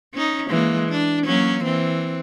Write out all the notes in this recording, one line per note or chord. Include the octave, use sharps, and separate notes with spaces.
C#4 D#4
E3 G#3 A#3
D4
F#3 A#3 C#4
E3 C4